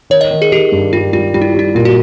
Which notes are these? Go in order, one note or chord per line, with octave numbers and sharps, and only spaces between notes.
D#3 C#5
D#5
D#3
G#4
D#3 G4
G2
G3 F4
G3 F4
G3 F4
E4
G3 E4
A#2 F4
F#4